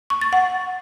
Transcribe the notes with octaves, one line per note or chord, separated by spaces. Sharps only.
C#6
A6
F#5